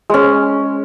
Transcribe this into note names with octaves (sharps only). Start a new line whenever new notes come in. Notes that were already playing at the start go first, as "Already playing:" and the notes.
G#3 C#4